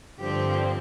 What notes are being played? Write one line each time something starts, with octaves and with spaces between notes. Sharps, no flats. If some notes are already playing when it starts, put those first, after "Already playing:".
G2 D3 F3 C4 G4